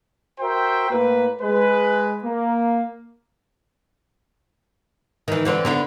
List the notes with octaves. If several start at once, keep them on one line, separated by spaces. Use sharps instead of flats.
F#4 A#4 C5 E5 G5
A2 A#3 B4
G#3 B4
A#3
D#3 E3
D3 E3 C4
D3 B3 E4